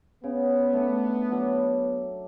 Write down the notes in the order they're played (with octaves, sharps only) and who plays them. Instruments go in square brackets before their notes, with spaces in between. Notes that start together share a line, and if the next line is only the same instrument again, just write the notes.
[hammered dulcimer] C#3 [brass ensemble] B3
[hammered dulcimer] A3 D4 A4
F#3 A4 D5